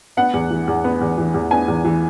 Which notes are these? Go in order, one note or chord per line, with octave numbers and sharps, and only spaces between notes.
B3 F#5
E2
E3
E2
B3
E2
E3
E2
B3 G#5
E2
E3